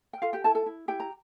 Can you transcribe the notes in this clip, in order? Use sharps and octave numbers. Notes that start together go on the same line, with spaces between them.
G5
F4 A4 F5
G4 G5
E4 A4 A5
A4 A5
E4
E4 G4 G5
A#5